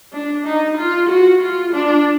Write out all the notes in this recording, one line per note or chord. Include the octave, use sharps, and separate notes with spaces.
D4
D#4
F4
F#4
F4
D4